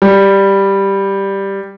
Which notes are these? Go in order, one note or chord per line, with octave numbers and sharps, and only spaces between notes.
G3